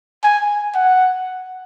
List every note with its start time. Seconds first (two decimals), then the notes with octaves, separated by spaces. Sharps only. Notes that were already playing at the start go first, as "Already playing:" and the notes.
0.23 G#5
0.75 F#5